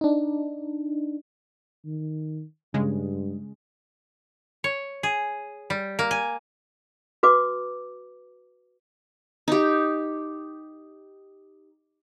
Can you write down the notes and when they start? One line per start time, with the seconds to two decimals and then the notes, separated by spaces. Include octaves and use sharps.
0.01 D4 D#4
1.85 D#3
2.74 G2 C#3 G#3
4.64 C#5
5.03 G#4
5.70 G3
5.99 A#3
6.11 G#5
7.23 F#4 B4 D6
9.48 D#4 G4